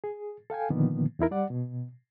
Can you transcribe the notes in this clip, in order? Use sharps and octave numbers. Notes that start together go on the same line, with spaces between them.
G#4
A4 F5 G5 G#5
A#2 D3 D#3 F3 A#3 B3
E2 D#4 E4 A#4
G3 D5 F#5
B2